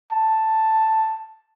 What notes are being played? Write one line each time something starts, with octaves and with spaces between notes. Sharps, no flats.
A5